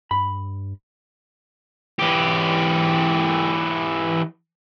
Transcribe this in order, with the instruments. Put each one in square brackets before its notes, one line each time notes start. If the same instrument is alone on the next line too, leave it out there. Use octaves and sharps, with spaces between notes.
[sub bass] G2 [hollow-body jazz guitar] B5
[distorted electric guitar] E3 G4